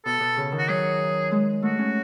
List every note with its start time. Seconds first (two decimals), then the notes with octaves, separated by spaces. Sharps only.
0.05 B2 A4
0.20 B2
0.37 C#3
0.52 D#3
0.58 F#4
0.68 F#3 G#4
1.31 G#3
1.62 A3 F#4
1.78 C#4